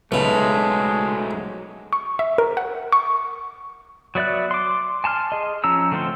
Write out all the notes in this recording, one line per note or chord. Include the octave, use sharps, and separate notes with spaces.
B1 C#3 F#3 G#3 A3
C#6
E5
A#4
F#5
C#6
F#3 B3 D5 E5 F#6
C6 D6
G#5 A5 C6 F6
G#4 D#5
F3 C#4 A#5 E6
D3 A3 C4 F4 C6